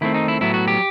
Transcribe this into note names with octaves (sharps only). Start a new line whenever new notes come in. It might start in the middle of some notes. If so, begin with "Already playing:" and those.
D#3 A3 C4 E4
D#4
E4
A2 F#3 B3 E4
F#4
G4